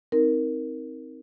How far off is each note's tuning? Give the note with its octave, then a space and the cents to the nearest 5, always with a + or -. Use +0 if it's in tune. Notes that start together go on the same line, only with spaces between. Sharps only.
C4 +0 D#4 +25 A#4 +0